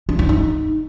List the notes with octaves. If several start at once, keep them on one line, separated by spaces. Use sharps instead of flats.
D4
D#4
D#4